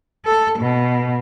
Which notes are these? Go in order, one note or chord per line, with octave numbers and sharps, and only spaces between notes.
A4
B2